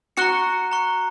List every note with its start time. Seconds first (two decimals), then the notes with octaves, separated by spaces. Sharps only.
0.17 F#4 A#5 C#6 F#6 C#7
0.71 A#5 C#6 F#6 C#7